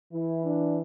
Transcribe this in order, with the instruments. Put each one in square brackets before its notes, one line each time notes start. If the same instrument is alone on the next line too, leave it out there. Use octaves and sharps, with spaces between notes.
[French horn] E3 [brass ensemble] E4
[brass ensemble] D4